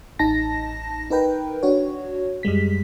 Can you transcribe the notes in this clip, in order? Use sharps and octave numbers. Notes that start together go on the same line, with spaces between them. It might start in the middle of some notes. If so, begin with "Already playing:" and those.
A1 D#4 A5 A#6
D#4 A#4 B4 G5
D4 F#4 C#5
F#2 G3 G#3 B6